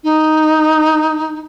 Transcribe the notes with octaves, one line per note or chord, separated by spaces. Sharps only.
D#4